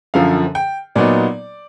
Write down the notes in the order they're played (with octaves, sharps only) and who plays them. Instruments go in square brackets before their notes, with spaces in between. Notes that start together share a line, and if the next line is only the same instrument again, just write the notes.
[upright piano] F#2 D3 F3 F5
G5
A#2 F#3 B3 D#4 D5